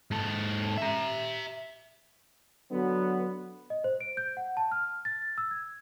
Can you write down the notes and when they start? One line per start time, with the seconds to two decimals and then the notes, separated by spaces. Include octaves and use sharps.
0.11 G#2 A4
0.78 E5 A#5
2.71 D3 F#3 B3
3.70 D#5
3.84 C5
4.01 D7
4.17 G6
4.37 F#5
4.57 A5
4.72 F6
5.05 A6
5.38 E6
5.51 G#6